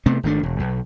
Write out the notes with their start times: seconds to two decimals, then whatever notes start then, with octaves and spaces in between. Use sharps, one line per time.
0.06 C3 A3 B3 C4
0.23 G#1 D#3 A3 D4
0.43 E1
0.60 B1